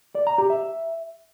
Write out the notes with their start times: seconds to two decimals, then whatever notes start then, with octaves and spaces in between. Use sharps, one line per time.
0.15 D5
0.27 A#5
0.38 G4
0.50 E5